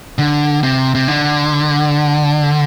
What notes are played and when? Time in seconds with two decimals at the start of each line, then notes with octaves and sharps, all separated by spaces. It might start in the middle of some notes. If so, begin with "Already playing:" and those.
0.18 D3
0.63 C3
0.95 C3
1.08 D3